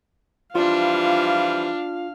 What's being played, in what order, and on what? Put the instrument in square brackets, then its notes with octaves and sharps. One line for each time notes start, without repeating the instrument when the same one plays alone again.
[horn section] E3 F3 G3 [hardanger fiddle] D4 [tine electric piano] F4 [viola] F5